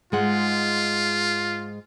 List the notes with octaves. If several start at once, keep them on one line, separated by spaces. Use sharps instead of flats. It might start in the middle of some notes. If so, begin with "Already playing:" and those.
G#2 G#3 F4 F#5